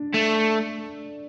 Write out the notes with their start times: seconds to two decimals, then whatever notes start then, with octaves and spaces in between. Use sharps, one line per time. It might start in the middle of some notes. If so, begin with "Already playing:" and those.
Already playing: D4
0.14 A3